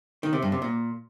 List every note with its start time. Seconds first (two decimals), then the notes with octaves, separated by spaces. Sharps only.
0.23 D#3
0.33 C3
0.42 G2
0.52 C3
0.62 A#2